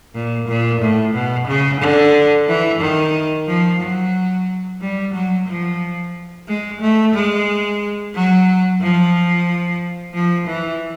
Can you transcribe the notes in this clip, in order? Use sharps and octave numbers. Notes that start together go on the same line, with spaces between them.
A#2
A#2
A2
B2
C#3
D3
E3
D#3
F3
F#3
G3
F#3
F3
G#3
A3
G#3
F#3
F3
F3
E3